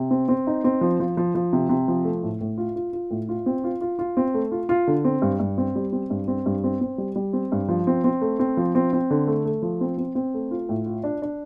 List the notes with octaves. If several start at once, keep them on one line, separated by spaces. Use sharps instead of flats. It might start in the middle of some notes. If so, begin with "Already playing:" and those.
Already playing: C3
C4
C4
D#4
C4
F3
F3
F3
F3
C3
C3
F3
A3
A2
A2
F4
F4
F4
A2
F4
C4
F4
F4
F4
C4
A3
F4
F4
D3
C4
G2
G2
C4
G3
C4
G2
C4
G2
C4
C4
G3
G3
C4
G2
F3
C4
C4
A3
C4
F3
C4
C4
D3
A3
A3
F3
C4
C4
C4
A3
F4
A2
F4
D4
D4